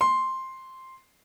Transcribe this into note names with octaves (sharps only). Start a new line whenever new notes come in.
C6